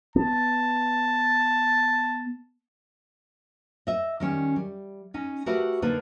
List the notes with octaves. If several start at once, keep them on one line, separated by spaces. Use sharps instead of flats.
B3 A5
D#5 E5
D#3 G3 C#4
G3
C#4 D#4
A3 F#4 G4 A#4 B4 E5
D3 A#3 D4 D#4 B4